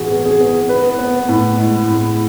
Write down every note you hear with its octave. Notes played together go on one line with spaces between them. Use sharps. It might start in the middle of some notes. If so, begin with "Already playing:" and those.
Already playing: A2 E3 B3 F#4 G#4
B3
G#4
B3
B3 B4
B3
A2
G#3
A2